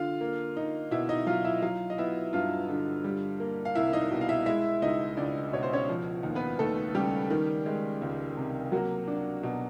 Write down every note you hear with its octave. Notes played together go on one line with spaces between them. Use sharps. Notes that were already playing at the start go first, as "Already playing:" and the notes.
Already playing: D3 F4 F5
A#3
D#4
B2 E4 E5
D#4 D#5
F#3 F4 F5
E4 E5
F#3 F4 F5
D#5
B3 E4 E5
G2 F4 F5
D3
G3
A#3
F5
C2 E4 E5
D#4 D#5
B2
F5
E4 E5
G#3 E4 E5
C#2 D#4 D#5
C#2 D4 D5
B2 C#5
C5
C#4 C#5
F3
D#2
B3 B4
D#2 A3 A4
C#3 G3 G4
D#3
G#3
C#2
C3
F#3 A#3 F#4
D4
B2